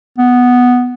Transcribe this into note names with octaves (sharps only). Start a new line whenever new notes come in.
B3